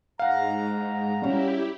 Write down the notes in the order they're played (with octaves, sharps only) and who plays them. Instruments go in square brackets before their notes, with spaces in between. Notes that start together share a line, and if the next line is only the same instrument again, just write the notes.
[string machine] G#2 [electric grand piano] F5 F#5 [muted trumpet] A#5
[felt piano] G3 C#4 [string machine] E4 G4